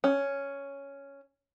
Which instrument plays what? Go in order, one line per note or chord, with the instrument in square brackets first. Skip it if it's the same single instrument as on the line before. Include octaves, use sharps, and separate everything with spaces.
[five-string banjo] C#4